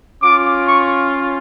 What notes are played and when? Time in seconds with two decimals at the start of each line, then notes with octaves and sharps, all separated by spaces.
0.22 C#4 F4 D6
0.68 C#6